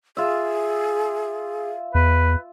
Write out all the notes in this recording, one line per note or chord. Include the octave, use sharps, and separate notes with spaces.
F4 G#4 E5
E2 B4